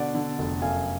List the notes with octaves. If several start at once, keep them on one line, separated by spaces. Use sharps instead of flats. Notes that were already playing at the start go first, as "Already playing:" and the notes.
Already playing: B2 D3 D5 F#5
D3
F1
F#2 F5 G#5